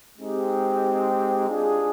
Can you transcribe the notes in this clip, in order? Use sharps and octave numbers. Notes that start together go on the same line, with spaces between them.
G#3 C4 D#4 G4
D4 F4 G#4